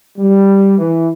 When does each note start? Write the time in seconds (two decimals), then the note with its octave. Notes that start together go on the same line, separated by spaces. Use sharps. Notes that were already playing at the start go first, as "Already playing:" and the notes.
0.18 G3
0.79 E3